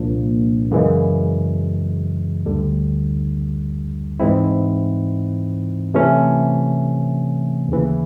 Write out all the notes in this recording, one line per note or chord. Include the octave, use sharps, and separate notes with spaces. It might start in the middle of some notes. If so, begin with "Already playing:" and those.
Already playing: C2 A#2 F3 A#3 D4
F#2 C#3 E3 G#3
D2 D3 G3
G#2 E3 G#3 C4 E4
C3 E3 A3 C#4
D#2 C#3 E3